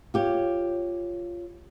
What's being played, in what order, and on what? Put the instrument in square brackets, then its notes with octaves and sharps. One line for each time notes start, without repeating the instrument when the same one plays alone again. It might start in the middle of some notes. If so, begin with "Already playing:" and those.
[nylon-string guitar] F4 G4 C#5